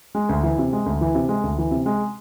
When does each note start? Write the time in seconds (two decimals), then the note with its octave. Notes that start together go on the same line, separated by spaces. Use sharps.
0.15 G#3
0.29 D2
0.43 E3
0.58 C3
0.73 G#3
0.86 D2
1.01 E3
1.15 C3
1.29 G#3
1.43 D2
1.58 E3
1.71 C3
1.86 G#3